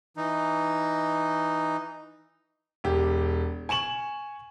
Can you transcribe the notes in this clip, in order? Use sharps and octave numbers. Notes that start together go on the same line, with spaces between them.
E3 D#4
E1 G4
G#5 C#6 E7 F#7